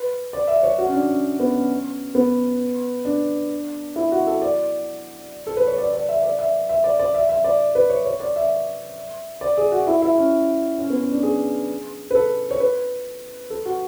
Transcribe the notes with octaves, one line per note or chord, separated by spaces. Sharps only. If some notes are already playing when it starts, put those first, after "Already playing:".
Already playing: B4
D5
E5
C#5
F#4
C#4
D4
C#4
B3
C#4
B3
D4
E4
F#4
A4
D5
A4
B4
C#5
D5
D5
E5
D5
E5
E5
D5
D5
E5
E5
D5
B4
C#5
C#5
D5
E5
D5
G#4
F#4
E4
E4
C#4
C#4
B3
C#4
D4
G#4
B4
A4
C#5
B4
A4
F#4